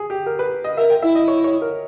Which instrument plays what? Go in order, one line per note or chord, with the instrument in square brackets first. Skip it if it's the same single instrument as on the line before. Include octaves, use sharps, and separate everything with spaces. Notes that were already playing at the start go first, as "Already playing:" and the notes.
Already playing: [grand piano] G#4
G4
A#4
B4
D#5
[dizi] A#4 [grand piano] E5
[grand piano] G5
[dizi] E4 [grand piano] E5
[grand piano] D#5
C#5
C#5
A#4